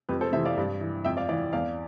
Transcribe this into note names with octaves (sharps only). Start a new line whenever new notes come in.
F2 G4 B4
A4 C5
C3 E3 C5 E5
D5 F5
G2
E3
F2 E5 G5
D5 F5
E3 D5 F5
E2 D5 F5